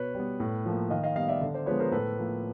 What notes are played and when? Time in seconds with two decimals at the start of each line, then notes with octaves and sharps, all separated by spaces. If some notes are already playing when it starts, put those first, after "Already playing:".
Already playing: B2 B4 C#5
0.15 G3 B3
0.40 A2
0.66 F3 A#3
0.90 D#3 D#5 F5
1.03 D#5 F5
1.16 G3 B3 D#5 F5
1.28 D5 E5
1.41 D3
1.54 C5 D5
1.66 F3 G#3 B3 B4 C#5
1.79 A#4 C5
1.92 A2 A4 B4
2.18 F3 A#3